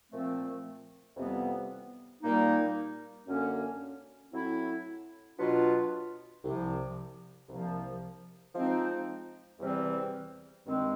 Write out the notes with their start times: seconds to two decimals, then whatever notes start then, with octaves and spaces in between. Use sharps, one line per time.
0.11 A#2 F3 A3 C4
1.16 F2 C3 E3 G3 B3
2.22 A#2 G3 A#3 D#4
3.27 F#2 D3 F#3 A#3 C#4
4.33 A2 F#3 A3 C4 E4
5.38 B2 F#3 B3 D4 F4
6.43 C2 C3 F3
7.49 C2 C3 F3 A#3
8.55 F3 G#3 C4 D#4
9.60 E2 C3 E3 G3 C4
10.66 G2 D#3 G#3 C4